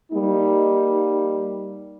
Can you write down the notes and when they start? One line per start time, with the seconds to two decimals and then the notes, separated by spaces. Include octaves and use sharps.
0.12 G3 A#3 D#4